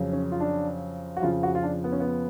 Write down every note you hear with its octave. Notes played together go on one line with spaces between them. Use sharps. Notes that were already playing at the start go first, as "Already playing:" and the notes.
Already playing: F2 C#3 F#3
C#4
F4
D4
F#4
F2 C#3 F3 F4
F#4
F4
D4
B3
C#4
B3